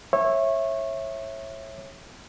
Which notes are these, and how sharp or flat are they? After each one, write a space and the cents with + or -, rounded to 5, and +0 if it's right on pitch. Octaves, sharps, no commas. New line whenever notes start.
C#5 -25 E5 +0